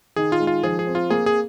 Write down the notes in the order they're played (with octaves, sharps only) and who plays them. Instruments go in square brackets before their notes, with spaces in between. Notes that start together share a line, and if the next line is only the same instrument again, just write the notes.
[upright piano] D#3 [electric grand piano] G#4
[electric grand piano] F4
[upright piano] G#3
[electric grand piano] F4
[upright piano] F3 [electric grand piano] G#4
[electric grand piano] G#4
[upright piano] C4
[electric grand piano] F4
[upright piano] A#3 [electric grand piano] G#4
[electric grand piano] G#4